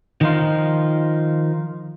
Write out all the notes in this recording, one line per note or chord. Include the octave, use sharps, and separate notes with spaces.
D#3 F3 D#4 F4